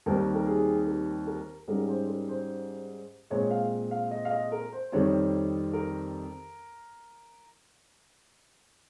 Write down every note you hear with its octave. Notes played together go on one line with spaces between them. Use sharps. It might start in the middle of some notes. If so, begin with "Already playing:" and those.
D#2 D#3 G3 C4 A#4
A#4
G#4
A#4
A#4
G#2 G3 C#4 A#4
C5
A#4
C5
A#2 G#3 C4 C#5
F5
F5
D#5
F5
D#5
A#4
C5
F2 D#3 G3 C4 C#5
A#4